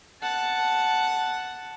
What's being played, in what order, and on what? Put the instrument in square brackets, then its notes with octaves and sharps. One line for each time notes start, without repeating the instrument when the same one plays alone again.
[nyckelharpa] F#5 A5